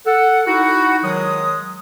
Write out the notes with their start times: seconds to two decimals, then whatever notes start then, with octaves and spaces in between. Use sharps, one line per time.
0.06 A4 F#5
0.47 D#4 E4 F#4
1.04 D#3 F#3 G#3 D#6